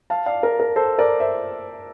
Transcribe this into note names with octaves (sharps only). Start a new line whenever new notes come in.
F5 A5
D5 F5
A#4
A#4
A4 C5
A#4 D5
C5 E5